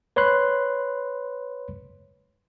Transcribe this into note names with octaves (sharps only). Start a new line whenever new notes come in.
B4 C#5 B5 C6 F#6